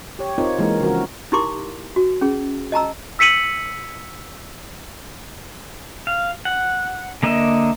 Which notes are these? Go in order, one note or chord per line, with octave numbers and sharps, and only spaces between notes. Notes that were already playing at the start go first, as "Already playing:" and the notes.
G4 C#5
C4 D#4 F4 A#4 C#5
E3 G#3 A#3 D#4 A#4
C#3 F3 F#4 A#4
D#4 E4 G4 A#4 C6 D6
F#4
C#4 G#4
D#5 A5 A#5 E6
E6 B6 C#7 D#7 F#7
F5
F#5
D3 A#3 D#5 E5